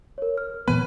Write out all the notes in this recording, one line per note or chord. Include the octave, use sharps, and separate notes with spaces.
A#4 C#5
F6
A#2 E3 B3 B4